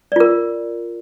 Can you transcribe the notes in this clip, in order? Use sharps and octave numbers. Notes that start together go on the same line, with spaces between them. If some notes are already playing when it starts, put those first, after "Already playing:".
F4 A#4 D5